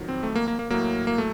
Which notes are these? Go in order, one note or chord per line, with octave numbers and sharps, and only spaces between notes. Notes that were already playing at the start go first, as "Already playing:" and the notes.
Already playing: F2 D#3 F#3
C4
A3
A#3
A#3
A#3
A2 F#3 A#3
A#3
A3